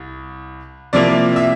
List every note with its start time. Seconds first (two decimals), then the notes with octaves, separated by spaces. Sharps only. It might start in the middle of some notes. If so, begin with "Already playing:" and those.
Already playing: C2
0.93 C3 F3 A#3 E4 D5
1.36 E5